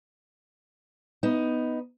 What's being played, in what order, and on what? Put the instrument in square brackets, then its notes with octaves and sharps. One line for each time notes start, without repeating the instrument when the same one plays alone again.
[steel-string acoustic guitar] B3 D#4